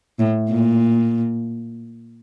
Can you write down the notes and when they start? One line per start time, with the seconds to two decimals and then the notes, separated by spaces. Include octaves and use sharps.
0.19 A2
0.49 A#2